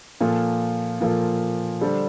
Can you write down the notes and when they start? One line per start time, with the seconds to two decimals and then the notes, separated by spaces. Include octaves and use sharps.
0.21 A#2 F3 A#3 F4 A4
1.00 A#2 F3 A#3 F4 A4
1.81 D3 G3 D4 A4 C5